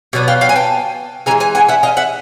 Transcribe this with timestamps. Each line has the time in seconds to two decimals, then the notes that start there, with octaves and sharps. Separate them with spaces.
0.13 B2 F#3 B3 D4
0.28 F5 G5
0.41 F5 G5
0.49 G#5
0.56 G5 A5
1.26 C#3 E3 G#3 G#5 A#5
1.40 G#5 A#5
1.55 F#5 G#5
1.69 E5 F#5
1.83 D#5 F5
1.97 E5 F#5